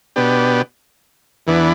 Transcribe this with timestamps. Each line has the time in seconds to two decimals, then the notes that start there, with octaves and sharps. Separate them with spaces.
0.16 B2 B3 D4 G4
1.47 E2 E3 B3 D4